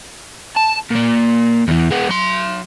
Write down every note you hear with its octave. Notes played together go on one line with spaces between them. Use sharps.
A5
A#2 A#3
E2 E3
G#3 B3
F#3 C6